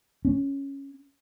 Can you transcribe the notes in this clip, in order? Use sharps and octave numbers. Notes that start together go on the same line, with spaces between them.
C#4